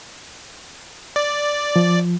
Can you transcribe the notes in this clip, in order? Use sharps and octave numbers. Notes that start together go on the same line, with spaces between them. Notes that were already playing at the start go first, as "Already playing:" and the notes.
D5
F3